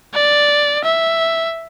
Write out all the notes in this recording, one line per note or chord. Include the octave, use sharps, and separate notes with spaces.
D5
E5